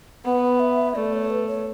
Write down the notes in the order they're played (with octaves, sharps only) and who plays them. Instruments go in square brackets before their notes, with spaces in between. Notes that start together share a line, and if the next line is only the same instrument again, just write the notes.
[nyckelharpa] B3 [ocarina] F#5
[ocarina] E5
[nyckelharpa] A3 [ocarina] D5
[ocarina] C#5
B4
C#5